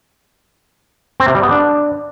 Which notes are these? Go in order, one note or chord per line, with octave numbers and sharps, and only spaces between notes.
C4
C3
G3
B3
D4